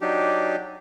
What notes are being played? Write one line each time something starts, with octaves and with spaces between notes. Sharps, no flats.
F#3 D4 D#4 G4